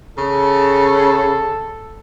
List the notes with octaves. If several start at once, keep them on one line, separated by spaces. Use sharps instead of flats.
C#3 A4